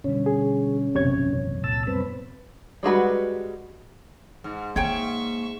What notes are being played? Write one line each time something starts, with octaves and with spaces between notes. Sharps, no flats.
B2 D3 G3 C#4
G#4
E1 A#1 F#2 C3 C#5 G#6
C#2 A#2 A5 E6
F#2 G3 B3 C4 B4
G3 G#3 F#4 B4
G#2
A#3 C#5 E5 G5 G#5 C#6